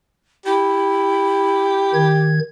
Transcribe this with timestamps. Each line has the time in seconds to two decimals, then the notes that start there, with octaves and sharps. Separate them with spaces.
0.46 E4 G4
1.94 D#3 G#6